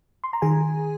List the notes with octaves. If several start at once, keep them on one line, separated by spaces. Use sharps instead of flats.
C6
A#5
D#3 G#4 G#5